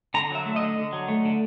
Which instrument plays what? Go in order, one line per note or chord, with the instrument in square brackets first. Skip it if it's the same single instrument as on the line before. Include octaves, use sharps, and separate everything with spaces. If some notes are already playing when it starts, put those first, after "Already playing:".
[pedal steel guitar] D3 A#5
F#3 E5
A3
D#5
D3
D3
F#3
A3
D3